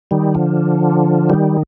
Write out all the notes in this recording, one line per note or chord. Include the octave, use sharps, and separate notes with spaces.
D#3 G3
D3 F3
D#3 G3